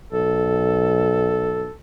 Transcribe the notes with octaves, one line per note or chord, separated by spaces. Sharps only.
B1 A4